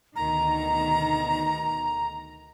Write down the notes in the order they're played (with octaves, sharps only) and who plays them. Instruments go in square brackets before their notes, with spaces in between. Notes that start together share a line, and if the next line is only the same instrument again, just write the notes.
[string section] D2 B2 D#3 [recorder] A#5